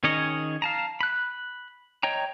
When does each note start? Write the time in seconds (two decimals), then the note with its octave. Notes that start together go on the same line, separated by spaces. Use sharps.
0.04 D#3 C#4 G#4 C#5 D#5
0.62 F5 A5 A#5
1.01 B5 F#6
2.03 C#5 D#5 G5 A#5